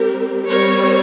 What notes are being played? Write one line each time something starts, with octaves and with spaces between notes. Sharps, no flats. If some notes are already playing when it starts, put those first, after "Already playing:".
Already playing: G3 C4 G4 A#4
G3 C4 A#4 C#5